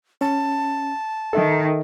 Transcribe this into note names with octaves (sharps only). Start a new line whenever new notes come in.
C#4 A5
D#3 A4 E5